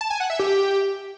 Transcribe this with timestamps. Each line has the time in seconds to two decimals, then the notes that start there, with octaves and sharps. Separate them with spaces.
0.01 A5
0.10 G#5
0.20 F#5
0.30 E5
0.39 G4